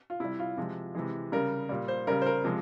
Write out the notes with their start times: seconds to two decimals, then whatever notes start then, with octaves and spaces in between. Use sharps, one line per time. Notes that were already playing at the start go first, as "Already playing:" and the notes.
0.10 F4
0.20 C3 G3 E4
0.39 F4
0.57 C3 F3 G#3
0.95 C3 E3 G#3
1.32 C#3 G3 A#4
1.69 A#2 G3
1.88 C5
2.07 C#3 G3 A#4
2.22 C5
2.26 A#4
2.44 C3 F3 G#3